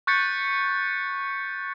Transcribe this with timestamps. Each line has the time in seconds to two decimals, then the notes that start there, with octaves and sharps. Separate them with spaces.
0.07 C#6 F#6 G6 A6 B6 C#7